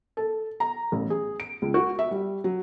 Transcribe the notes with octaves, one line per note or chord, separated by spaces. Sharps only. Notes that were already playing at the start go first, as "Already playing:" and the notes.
A4
A#5
A1
G#4
D7
C#2
F#4
E5
G3
F#3